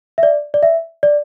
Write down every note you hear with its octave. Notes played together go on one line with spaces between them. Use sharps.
E5
D5
D5
E5
D5